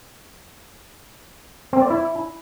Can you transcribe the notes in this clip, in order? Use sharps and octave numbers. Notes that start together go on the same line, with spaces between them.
C4
D5
E4